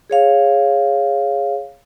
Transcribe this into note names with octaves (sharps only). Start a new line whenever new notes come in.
G#4 C#5 F5